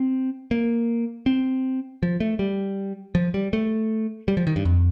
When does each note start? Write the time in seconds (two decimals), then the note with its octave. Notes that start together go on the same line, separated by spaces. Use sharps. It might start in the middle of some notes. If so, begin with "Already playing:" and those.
Already playing: C4
0.51 A#3
1.26 C4
2.03 F3
2.20 A3
2.39 G3
3.15 F3
3.34 G3
3.53 A3
4.28 G3
4.37 F3
4.47 D#3
4.56 G2
4.65 F2